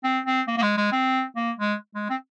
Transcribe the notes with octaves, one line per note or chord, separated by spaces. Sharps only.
C4
C4
A#3
A#3
G#3
G#3
C4
A#3
G#3
G#3
C4